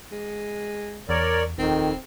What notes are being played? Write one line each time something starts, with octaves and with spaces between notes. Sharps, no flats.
G#3
E2 A#4 C#5 D5
D#1 F2 D#3 C4